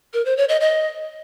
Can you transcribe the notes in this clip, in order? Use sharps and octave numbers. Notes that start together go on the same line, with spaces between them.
A#4
C5
C#5
D#5
D#5